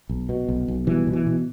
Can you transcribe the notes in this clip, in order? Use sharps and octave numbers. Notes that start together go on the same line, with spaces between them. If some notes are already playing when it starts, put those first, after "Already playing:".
B1
B2
B1
B1
B2 E3 G3
B2
E3
B2